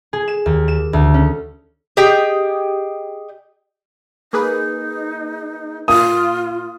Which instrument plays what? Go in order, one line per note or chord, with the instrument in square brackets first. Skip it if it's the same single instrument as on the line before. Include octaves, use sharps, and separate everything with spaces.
[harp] G#4
E7
D#2
E7
D2
C#4
[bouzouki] G4 G#4 D#5 G5
[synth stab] A#3 G#4 B4 [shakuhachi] D#4
[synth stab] A#2 [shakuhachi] F4 [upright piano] D#6